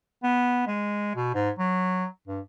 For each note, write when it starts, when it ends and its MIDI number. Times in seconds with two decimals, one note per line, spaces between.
0.23 0.62 59
0.67 1.14 56
1.16 1.35 47
1.35 1.50 44
1.59 2.06 54
2.28 2.40 43